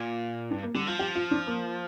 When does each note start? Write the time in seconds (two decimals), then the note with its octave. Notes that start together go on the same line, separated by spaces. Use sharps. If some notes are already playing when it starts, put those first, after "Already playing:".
Already playing: A#2
0.51 G2 D4
0.63 A#3
0.75 D3 G3
0.87 F3 F4
0.99 G4
1.15 F4
1.31 D4
1.47 A#3